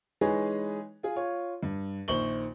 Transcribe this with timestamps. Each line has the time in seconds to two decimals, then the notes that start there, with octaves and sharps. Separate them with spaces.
0.21 E3 G#3 D#4 G#4 B4 C#5
1.03 F4 G#4
1.16 F4 C#5
1.63 G2
2.08 A#1 D#3 C5 C#6 F#7 G7